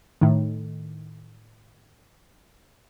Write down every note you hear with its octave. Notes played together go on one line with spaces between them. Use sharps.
A2 D#3